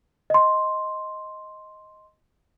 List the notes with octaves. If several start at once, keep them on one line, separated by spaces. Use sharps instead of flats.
D#5 C6